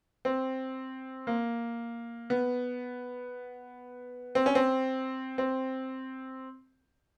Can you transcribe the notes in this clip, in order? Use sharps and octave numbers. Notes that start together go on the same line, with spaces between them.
C4
A#3
B3
C4
C#4
C4
C4